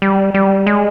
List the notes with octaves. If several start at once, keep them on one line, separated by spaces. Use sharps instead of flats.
G3
G3
G#3